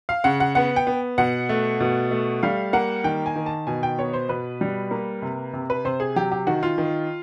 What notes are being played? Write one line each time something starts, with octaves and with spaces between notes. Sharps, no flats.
F5
C#3 F#5
F#5
B3 F#5
G5
B3
B2 F#5
A3
B2
A3
G3 F5
A#3 F#5
D#3 G5
G#5
D#3
A5
B2 G#5
G5
B3 C#5
C5
B2 B4
G3
A#3
C3
C3
B4
C3 C5
G#4
F#3 G4
G4
D#3 F#4
F4
D#3